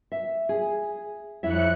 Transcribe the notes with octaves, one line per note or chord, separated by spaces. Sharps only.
E5
G#4
F2 E4 C#5 E5 F#6 C#7